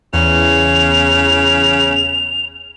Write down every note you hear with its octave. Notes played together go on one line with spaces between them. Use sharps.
E2 C#3 F7